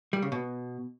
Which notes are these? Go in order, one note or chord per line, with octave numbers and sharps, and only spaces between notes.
G3
C#3
B2